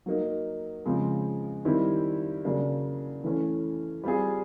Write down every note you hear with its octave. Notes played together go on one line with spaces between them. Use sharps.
F#3 A#3 D#4
C#3 F3 G#3 C4
D#3 G3 C4 E4
C#3 F#3 A#3 D4
E3 A3 C#4
G3 C4 F4 G#4